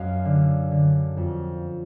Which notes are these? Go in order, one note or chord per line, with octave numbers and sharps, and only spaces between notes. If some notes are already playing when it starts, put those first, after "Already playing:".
Already playing: F#2 D#5 F5
D3
D3
F2